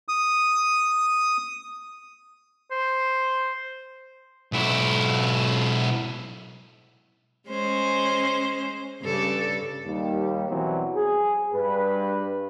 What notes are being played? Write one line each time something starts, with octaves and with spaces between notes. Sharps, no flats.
D#6
C5
B1 E4
G#3 C#4 C5
G2 C#3 A4
D#2 G3
B2 E3 F#3 G3 C4
G#4
G2 B4